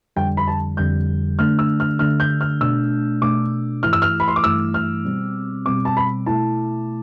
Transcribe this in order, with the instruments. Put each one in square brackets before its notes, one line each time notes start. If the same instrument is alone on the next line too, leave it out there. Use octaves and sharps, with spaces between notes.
[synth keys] F2 D3 G3 [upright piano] G5
[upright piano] B5
A5
[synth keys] F2 D3 G3 [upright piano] G6
[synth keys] D3 A3 D4 [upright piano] F6
[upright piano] E6
F6
[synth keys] D3 A3 D4 [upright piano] F6
[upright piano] G6
F6
[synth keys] B2 A3 D4 [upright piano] E6
[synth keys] B2 A3 D4 [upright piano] D6
[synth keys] G2 E3 A3 E4 [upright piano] F6
[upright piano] E6
F6
B5
C6
D6
[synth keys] G2 E3 A3 E4 [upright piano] E6
[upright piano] F6
[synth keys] B2 G3 C4
[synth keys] B2 G3 C4 [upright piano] D6
[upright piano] A5
B5
[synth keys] B2 A3 E4 [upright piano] A5